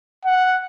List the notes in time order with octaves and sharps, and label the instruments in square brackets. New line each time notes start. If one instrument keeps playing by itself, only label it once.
[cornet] F#5